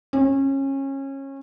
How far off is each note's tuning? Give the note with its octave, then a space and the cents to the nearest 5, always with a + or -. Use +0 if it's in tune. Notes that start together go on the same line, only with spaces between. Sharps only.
C#4 -25